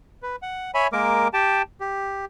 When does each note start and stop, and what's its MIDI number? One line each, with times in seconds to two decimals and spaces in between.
0.23 0.36 71
0.42 0.71 78
0.74 0.87 73
0.74 0.87 76
0.74 0.87 80
0.74 0.87 83
0.93 1.28 56
0.93 1.28 58
0.93 1.28 70
0.93 1.28 86
1.33 1.62 67
1.33 1.62 79
1.33 1.62 81
1.80 2.25 67